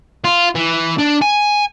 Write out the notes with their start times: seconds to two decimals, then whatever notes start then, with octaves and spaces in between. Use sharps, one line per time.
0.24 F4
0.55 E3
0.99 D4
1.22 G#5